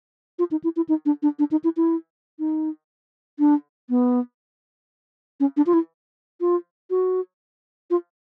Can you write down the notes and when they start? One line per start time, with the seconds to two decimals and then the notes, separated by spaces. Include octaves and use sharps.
0.39 F4
0.51 D#4
0.64 E4
0.76 E4
0.89 D#4
1.06 D4
1.23 D4
1.39 D4
1.51 D#4
1.64 E4
1.77 E4
2.39 D#4
3.39 D4
3.90 B3
5.40 C#4
5.57 D4
5.66 F4
5.74 E4
6.41 F4
6.90 F#4
7.90 F4